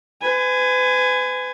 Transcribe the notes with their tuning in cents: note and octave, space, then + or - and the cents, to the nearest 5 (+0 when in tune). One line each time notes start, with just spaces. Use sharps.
B4 +40 G#5 +0